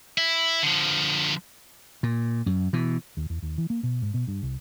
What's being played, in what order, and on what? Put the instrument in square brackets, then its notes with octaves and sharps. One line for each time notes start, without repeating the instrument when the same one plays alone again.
[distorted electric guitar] E4
D3 F3
[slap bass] A#2
F#2
B2 E3
[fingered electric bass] D#2
E2
D#2
E3
A#3
B2
G#2
B2
G2
C2